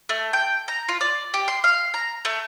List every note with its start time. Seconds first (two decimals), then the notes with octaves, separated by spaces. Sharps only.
0.09 A3
0.33 G5
0.68 A#5
0.89 F4
1.01 D5
1.34 G4
1.48 C6
1.64 F5
1.94 A#5
2.25 A3